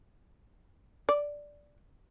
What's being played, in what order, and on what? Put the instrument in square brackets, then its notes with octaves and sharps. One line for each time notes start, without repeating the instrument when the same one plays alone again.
[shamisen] D5